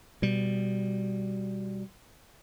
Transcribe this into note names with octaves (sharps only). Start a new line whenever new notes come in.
B2 G3